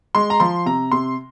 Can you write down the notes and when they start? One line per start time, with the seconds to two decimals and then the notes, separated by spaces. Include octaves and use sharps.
0.15 G#3 C6
0.30 A#5
0.40 F3 C6
0.66 C3 A#5
0.92 C3 C6